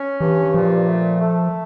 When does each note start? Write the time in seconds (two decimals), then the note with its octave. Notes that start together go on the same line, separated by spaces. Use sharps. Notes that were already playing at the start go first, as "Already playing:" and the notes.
Already playing: C#4
0.21 G2 E3
0.54 A#2 F3
0.88 A3
1.21 A3